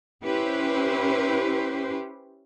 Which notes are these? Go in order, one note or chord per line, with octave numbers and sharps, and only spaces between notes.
C#4 E4 G4 B4 C5